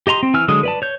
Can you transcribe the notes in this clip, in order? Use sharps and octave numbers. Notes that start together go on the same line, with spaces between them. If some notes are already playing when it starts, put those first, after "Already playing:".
G4 D#5 A#5 C6
C4
E3 G#5 E6 F6
D3 F#3 G#3 D#5 D#6
B4 D5 A5
C#5 G6